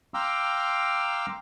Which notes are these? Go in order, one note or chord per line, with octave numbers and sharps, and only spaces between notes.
F5 G5 A#5 C6 D6 E6